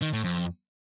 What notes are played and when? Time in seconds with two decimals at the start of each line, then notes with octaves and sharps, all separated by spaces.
0.02 D#3
0.13 A2
0.24 F2